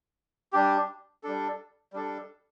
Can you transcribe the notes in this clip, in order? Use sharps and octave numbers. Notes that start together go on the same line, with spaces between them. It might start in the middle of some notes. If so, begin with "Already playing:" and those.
G3 D4 G4
G3 D4 A4
G3 D4 A4